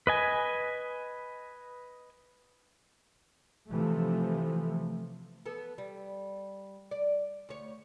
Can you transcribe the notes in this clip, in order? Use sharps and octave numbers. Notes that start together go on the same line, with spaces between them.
B4 D#5 G#5
C3 E3 F3 A3
B3 A4
G3
D5
D2 C#5